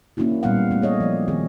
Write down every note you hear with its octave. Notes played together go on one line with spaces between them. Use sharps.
A#3 C#4 D4 E4 F#4
A#2 G3 G#3 B3 F5 F#5
A3 C4
G#4 C#5 D#5
F3 D5
D#3 C4 G#4